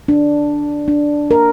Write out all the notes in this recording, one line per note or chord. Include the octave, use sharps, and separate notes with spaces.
D4
D4
A#4